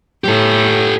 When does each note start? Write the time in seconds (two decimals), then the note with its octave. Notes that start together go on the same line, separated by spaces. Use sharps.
0.24 A2 G4 A4